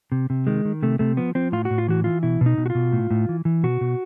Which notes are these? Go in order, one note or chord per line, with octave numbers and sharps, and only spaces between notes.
C3
C3
D#3 G#3
D#3
C3 A3
C3 A3
F3 B3
F3 C4
A2 F4
F#4
A2
F4
E3 F#4
E3 F4
B2 E4
B2
D#4
B2
F#4
F4
B2
A2
A2
E3
E3
B2 F#4
B2